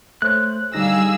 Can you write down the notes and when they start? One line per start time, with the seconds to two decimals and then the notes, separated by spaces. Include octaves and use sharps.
0.22 A3 C5 C#5 F#6
0.74 D3 G3 D#4 G#4 F5 E6 A#6